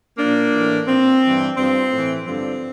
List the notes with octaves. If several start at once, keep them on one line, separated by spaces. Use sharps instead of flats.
A#2 F3 A#3 D4
A2 E3
A#2 F3 C4
G2 E3
G2 F3 C4
A2
E3
G2 D3 F3 C4